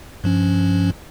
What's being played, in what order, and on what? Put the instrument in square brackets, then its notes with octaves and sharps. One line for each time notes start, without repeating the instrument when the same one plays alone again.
[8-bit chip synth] G2 F3 C#4